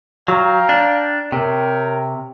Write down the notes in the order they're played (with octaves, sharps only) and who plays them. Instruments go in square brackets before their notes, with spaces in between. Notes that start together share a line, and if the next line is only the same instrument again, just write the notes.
[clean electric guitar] F#3 [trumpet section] F5 G5 A#5
[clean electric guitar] D4
[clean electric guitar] C3 [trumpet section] A#4 C#5 G5